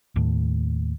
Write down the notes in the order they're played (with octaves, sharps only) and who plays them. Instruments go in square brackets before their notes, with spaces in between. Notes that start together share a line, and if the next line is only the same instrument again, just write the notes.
[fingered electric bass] D#2 A2